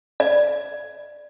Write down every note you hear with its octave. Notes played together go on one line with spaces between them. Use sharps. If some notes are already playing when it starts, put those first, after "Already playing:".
D5